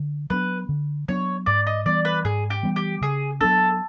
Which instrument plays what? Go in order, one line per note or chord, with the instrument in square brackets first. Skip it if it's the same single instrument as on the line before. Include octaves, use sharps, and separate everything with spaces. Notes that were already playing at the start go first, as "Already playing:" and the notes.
Already playing: [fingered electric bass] D3
[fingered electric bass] F#3 B3 D4 [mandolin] B4
[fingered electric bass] D3
[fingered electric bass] F#3 B3 D4 [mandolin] C#5
[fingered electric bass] G#2 [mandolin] D5
[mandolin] D#5
[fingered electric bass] E3 G3 B3 [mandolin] D5
[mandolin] B4
[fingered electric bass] G#2 [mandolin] G#4
[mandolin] G4
[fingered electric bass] E3 G3 B3
[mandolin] G4
[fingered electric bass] C#3 [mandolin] G#4
[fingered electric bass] F#3 B3 D4 [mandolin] A4